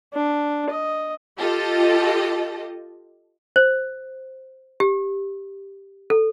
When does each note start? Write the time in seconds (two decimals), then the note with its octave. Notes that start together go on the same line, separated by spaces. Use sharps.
0.14 D4
0.70 D#5
1.39 F4 G4 A4 D#5
3.56 C5
4.80 G4
6.10 A4